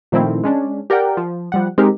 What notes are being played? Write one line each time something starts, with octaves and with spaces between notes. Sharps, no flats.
A#2 D#3 F3 A3 C4 E4
G#3 C#4 D4
G4 A#4 D5 F#5 G5
F3
F3 G3 F#5
G#3 C4 D#4 G4 A#4